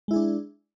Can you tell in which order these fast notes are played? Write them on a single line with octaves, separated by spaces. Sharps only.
G#3 E4 G#4 D4